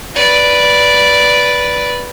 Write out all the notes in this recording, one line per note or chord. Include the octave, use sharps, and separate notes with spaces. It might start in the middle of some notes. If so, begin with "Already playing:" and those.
B4 D5